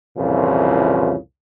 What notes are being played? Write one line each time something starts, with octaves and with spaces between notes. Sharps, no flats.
C2 F2 A#2 C#3 E3